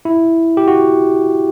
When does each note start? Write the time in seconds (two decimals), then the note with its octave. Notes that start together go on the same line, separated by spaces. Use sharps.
0.05 E4
0.57 G4
0.68 F#4